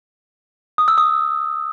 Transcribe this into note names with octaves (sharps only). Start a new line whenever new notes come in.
D#6
E6
D#6